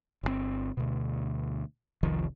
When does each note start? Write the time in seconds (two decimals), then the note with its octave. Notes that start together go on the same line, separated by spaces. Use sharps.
0.23 G1 B2 C4
0.77 D2 B2
2.03 F1 C2 D#3 F3